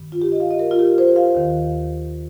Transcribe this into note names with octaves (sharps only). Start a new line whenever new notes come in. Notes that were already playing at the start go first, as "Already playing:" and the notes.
Already playing: G2 D#3
F4
G4
D#5
F5
D#5
A#4
F4
G4
C5
F5
D#2 D#3